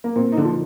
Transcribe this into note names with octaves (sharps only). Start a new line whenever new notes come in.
A#3
A#2 C4
D#4
D3 D4
F3